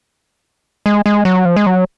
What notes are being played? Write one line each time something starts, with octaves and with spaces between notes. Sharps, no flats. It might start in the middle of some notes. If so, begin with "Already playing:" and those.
G#3
G#3
F#3
F3
G#3
F#3